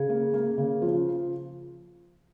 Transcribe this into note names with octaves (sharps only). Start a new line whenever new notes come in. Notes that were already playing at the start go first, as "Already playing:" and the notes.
Already playing: C#3 G#4
A#3
A#3
C#3
F3